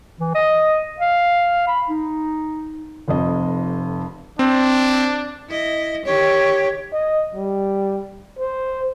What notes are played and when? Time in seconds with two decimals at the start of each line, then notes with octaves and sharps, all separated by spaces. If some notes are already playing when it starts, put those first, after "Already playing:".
0.20 E3
0.35 D#5
1.00 F5
1.67 B5
1.89 D#4
3.08 F1 F2 D#5
4.39 C4 D4
5.49 E4 D#5
6.05 D#3 G4 C#5
6.93 D#5
7.35 G3
8.39 C5